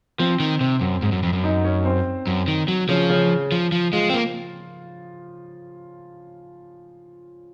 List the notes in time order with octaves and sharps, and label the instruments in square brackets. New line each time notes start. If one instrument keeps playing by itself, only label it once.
[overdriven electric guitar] F3 [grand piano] C4 C5
[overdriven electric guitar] D#3
C3
F#2
G#2
F#2
F2
F#2
[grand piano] D#4 D#5
C#4 C#5
C4 C5
[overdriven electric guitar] F#2
D#3
F#3
[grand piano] C#3 C#4 [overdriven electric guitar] F3
[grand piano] C#3 C#4
[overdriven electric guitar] F3
F3
[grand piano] F3 F4 [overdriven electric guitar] G#3
[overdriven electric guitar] C4
A#3